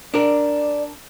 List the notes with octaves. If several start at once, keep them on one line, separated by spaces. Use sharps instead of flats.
D4 A#4 D5